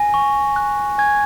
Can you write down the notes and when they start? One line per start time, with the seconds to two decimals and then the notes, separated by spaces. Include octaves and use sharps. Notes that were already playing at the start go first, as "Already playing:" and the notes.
Already playing: G#5 A#6
0.14 C#6
0.56 F#6
0.98 G#5 G#6